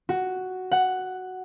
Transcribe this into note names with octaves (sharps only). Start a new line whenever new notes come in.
F#4
F#5